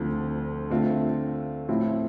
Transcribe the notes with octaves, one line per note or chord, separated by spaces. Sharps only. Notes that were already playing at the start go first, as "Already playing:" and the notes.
Already playing: D2 D3 F3 C4
D3 A3 C4 F4
A2 F3 C4 E4